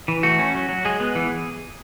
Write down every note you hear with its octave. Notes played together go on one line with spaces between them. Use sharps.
E3
A3 F#4
C#4
F#3
F#3
G#3 G#4
B3
E3